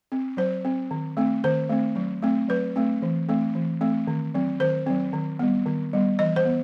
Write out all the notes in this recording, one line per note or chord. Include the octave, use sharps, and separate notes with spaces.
C4
F#3 C5
C4
D#3
A3 C4
D#3 C5
A3 C4
F#3
A3 C4
F#3 B4
A3 C4
E3
A3 C4
E3
A3 C4
D#3
F#3 C4
D#3 C5
F#3 C4
D#3
G3 B3
D#3
G3 B3
E3 D#5
C5
B3